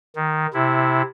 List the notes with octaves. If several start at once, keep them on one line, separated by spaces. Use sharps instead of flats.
D#3
C3 E4